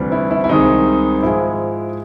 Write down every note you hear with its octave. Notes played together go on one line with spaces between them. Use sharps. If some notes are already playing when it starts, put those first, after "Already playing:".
Already playing: D2 C3 E3 G3
E4
E4
E4
C2 C3 D#3 G#3 D#4
G#2 F3 G#3 E4